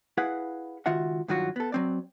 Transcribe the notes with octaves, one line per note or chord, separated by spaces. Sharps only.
E4 G#4 B4 F5 F#5
C#2 D#3 F4 F#4 E5 F#5
G2 D#3 F#3 F4 F#4
B3 A4
F#3 C4 D5